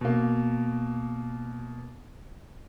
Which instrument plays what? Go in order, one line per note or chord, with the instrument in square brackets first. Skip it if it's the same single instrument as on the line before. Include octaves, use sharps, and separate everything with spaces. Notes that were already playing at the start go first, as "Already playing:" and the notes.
[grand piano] B2 A#3